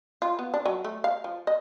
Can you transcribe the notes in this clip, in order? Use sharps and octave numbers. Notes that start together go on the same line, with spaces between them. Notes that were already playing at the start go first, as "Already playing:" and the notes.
F4
B3
D4
F#3
A3
F5
F3
D#5